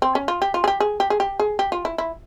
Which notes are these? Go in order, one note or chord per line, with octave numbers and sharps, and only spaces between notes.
C4
C#4
F4
G4
F4
G#4
G4
G#4
G4
G#4
G4
G#4
G4
F4
E4
E4